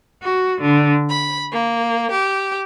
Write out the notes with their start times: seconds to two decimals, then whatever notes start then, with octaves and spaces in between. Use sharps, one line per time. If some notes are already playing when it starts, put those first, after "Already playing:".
0.22 F#4
0.61 D3
1.09 B5
1.51 A#3
2.11 G4